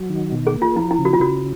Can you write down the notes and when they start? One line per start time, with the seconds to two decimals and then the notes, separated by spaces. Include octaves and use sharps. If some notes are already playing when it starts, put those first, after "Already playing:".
Already playing: F#3
0.10 D#3
0.32 B2
0.47 G#4
0.54 A#3
0.62 F4
0.76 F3 E4
0.91 E4
0.99 C#3
1.05 F#4
1.13 F4
1.20 C#3 F#4